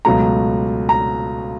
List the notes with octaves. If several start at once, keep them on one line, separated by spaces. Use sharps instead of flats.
C#2 B2 F#3 A3 A#5
A#5